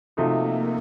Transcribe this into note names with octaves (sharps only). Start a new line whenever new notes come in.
C3 F3 A3 A#3 D#4 F#4